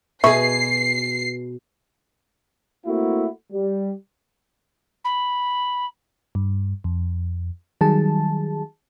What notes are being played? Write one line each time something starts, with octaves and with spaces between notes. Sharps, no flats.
B2 G#4 B4 E5 B5 C#6 C7
A3 A#3 C4 E4 F#4
G3
B5
G2
F2
D#3 F#3 G3 G#4 A5